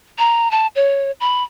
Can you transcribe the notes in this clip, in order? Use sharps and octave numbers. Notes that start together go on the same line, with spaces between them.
A#5
A5
C#5
B5